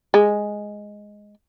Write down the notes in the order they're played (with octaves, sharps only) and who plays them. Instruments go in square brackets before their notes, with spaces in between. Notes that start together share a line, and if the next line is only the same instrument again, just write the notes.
[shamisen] G#3